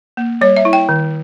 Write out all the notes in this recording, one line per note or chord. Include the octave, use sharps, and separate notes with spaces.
A#3
G3 C#5
E5
E4
G5
D#3